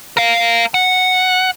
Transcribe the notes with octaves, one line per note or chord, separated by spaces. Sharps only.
A#4 F5
F#5